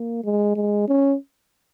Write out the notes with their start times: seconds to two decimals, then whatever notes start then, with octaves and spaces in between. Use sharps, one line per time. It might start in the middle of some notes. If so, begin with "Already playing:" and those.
Already playing: A#3
0.24 G#3
0.56 G#3
0.88 C#4